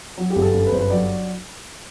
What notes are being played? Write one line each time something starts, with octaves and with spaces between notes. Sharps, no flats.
F#3
G4
G1
A4
F#2
B4
G1 C5
B4
F#3 D5